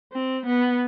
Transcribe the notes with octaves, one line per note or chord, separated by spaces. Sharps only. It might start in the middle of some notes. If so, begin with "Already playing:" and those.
C4
B3